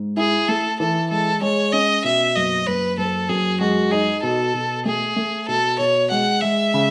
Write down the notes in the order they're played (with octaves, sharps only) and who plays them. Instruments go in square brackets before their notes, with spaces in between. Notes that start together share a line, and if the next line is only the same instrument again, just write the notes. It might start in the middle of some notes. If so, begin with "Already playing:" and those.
Already playing: [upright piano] G#2
[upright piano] E4 [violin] G#4
[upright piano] A3 [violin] A4
[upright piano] E3 [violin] A4
[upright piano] G#3 [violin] A4
[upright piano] G#3 [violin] C#5
[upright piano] C#4 [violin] D#5
[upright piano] B2 [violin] E5
[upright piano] F#1 [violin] D#5
[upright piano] F#1 [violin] B4
[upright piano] F#1 [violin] A4
[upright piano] F#2 [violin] G#4
[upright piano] G#3 [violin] F#4
[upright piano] D#4 [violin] G#4
[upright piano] B2 [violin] A4
[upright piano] B2
[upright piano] A3 [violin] G#4
[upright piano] A3
[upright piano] B2 [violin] A4
[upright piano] B2 [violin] C#5
[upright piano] G#3 [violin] F#5
[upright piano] G#3 [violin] E5
[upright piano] C#3